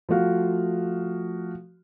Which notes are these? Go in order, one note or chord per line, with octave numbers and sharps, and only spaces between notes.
F3 A3 F#4 F5